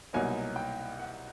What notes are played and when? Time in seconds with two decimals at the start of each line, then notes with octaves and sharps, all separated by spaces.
0.13 C2 B2 F#3 A#3 D#4 G#5
0.56 G5
0.99 F#5